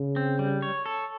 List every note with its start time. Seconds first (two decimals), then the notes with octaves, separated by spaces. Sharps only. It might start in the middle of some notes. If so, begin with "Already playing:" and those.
Already playing: C#3
0.16 C4
0.39 G3
0.62 C#5
0.86 A4